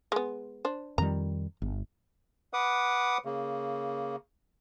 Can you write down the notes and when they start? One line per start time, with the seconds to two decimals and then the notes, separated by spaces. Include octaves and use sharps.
0.12 G#3 B3
0.65 D4 C5
0.98 F2 D#3 G3 A#5
1.62 G1
2.53 B4 F#5 D6 D#6
3.25 C#3 A#3